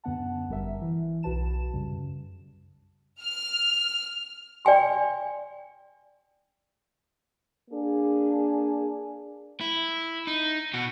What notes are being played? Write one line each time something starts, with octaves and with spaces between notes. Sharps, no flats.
F#2 D3 B3 F#5 A5
G1 G3 A#4 E5
E3
B1 F#4 B4 A5 E7
F#2 C#3 G3
F6
D5 G5 G#5 C6
A#3 D4 G#4
E4
D#4
B2 F#4